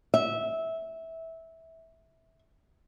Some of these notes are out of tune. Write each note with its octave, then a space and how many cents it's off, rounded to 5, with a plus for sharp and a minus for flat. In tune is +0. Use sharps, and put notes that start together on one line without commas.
E5 -15